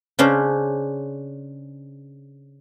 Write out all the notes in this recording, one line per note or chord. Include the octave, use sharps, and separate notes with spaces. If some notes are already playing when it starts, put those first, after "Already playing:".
C#3 C#4 D4 C5